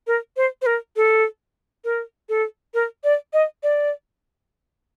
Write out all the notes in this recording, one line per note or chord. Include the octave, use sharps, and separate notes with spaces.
A#4
C5
C5
A#4
A4
A#4
A4
A#4
D5
D#5
D5